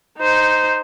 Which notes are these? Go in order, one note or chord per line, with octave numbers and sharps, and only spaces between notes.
D#4 C5